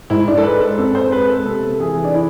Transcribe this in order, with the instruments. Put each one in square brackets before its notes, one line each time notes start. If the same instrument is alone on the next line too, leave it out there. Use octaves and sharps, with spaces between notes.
[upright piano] G#2 [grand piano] E4
[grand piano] D4
A4
[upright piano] G#3 [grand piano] B4
[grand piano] A4
[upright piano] C4 [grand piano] A4
[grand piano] C5
[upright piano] G#3 [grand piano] B4
[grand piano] A4
[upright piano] C3 [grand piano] A4
[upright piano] E3 [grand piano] G#4
[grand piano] D4
E4